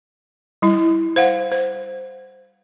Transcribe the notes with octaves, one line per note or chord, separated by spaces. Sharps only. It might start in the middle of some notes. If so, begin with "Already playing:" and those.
G3 E4
C5 F5 F#5
C5